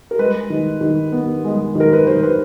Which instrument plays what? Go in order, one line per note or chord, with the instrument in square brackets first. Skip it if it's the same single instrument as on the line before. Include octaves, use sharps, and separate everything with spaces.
[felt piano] A#4
G#3 B4
D#3
D#3
B3
G#3
D#3 A#4
B4
D#3 C5
B4